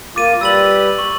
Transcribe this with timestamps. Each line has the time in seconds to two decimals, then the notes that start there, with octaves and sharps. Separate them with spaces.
0.16 A#3 F4 D6 A6 D#7
0.41 G3 G4 B4 E6 A6 F#7
0.98 C#6 F#7